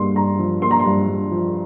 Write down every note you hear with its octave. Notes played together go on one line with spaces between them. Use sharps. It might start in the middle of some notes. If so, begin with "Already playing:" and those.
Already playing: G2 A#3 C6
G2 A#5
F3
A#3 C6
A#5
C6
G2
G2
F3